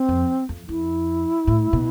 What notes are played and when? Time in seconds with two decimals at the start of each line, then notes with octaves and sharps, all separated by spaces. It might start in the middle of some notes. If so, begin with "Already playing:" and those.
Already playing: C4
0.09 F2
0.49 F2
0.68 F2 E4
1.47 A2
1.73 B2